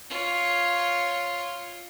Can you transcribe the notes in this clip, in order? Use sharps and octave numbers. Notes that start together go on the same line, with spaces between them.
F4 C#5